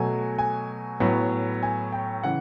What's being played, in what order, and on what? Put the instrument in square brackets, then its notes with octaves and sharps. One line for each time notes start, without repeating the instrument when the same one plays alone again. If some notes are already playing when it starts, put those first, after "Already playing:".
Already playing: [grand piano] B2 F#3 A3 G#5
G#5
A2 F#3 B3
G#5
G5
C#3 E3 F#5